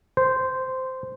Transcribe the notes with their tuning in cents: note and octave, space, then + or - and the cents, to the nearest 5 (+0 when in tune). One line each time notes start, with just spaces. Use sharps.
C5 -10